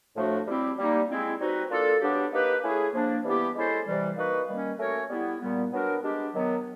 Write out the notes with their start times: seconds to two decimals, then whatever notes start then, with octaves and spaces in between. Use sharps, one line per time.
0.16 A2 F3 A3 D4 F#4
0.46 G3 C4 E4 G4
0.77 G3 A#3 D#4
1.09 G#3 C4 E4
1.40 G3 C4 D#4 F#4 B4
1.70 A#3 D4 F4 A4
2.01 F#3 B3 D4 G4
2.31 A#3 D#4 G4 B4
2.63 A3 C#4 E4 G#4
2.93 F3 A#3 D4
3.24 E3 G3 B3 E4 G4
3.55 G#3 C#4 E4 A4 C5
3.86 C3 E3 G3
4.17 A#3 D#4 F#4 B4
4.47 D#3 G3 A#3 C#4
4.79 A3 C#4 F#4 A#4 C#5
5.10 G3 B3 E4
5.40 A#2 G3 B3
5.71 F#3 B3 D4 F#4 A#4
6.02 G#3 B3 D4 G4
6.33 D#3 F#3 B3